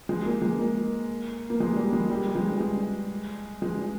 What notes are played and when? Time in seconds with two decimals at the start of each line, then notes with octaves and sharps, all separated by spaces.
0.09 G#3
0.25 A#3
0.42 G#3
0.59 A#3
1.50 A#3
1.60 G#3
1.76 G3
1.93 G#3
2.10 G3
2.35 G#3
2.60 G#3
3.62 G#3